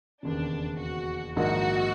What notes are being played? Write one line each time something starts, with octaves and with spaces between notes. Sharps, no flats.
E1 D#2 C#3 D4
F#4
A#1 G#2 D#3 F#4